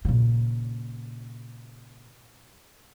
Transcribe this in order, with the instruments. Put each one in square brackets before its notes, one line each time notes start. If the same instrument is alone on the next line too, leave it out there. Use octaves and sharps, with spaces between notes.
[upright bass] A#2 C#3